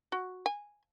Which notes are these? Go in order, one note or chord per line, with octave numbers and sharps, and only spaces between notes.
F#4
G#5